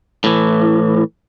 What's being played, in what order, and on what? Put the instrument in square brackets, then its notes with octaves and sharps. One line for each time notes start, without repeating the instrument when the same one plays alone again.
[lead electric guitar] A2 E3